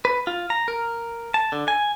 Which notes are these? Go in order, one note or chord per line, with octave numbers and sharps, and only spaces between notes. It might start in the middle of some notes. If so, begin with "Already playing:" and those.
B4
F4
A#5
A#4
A5
D3
G#5